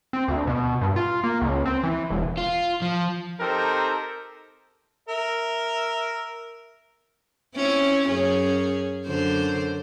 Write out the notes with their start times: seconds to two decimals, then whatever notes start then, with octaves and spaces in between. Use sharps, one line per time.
0.13 C4
0.28 D2
0.47 B2
0.81 G2
0.96 F4
1.24 A#3
1.41 C#2
1.65 C4
1.83 E3
2.10 E1
2.37 F4
2.82 F3
3.40 C4 D#4 G4 A4 A#4 C5
5.09 A#4 E5
7.56 C4 C#4 E4
8.08 F#2 C#4 G#4
9.07 F#2 D3 C5